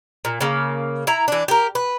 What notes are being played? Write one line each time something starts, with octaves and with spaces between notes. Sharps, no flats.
A#2
C#3 A#3
E4 A#5
E3 D4
G4 A#4
B4